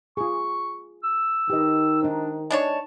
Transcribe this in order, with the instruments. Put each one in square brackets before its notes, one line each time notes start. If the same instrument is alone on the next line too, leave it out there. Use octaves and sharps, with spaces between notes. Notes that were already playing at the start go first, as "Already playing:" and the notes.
[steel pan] F4 G#4 [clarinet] C#6
[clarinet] E6
[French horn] D#3 [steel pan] G4 B4 D#5
[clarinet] D4 [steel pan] D#4 C5
[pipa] G#3 D4 C#5 [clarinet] A5